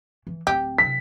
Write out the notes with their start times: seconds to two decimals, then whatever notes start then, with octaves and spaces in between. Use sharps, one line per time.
0.27 E3
0.47 D1 C4 G4
0.78 C3 F#3 B6